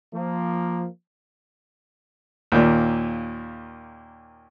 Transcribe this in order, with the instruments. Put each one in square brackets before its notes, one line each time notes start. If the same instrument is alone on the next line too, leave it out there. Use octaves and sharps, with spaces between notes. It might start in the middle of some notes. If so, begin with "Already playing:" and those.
[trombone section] F3 A#3
[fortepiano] D#2 A#2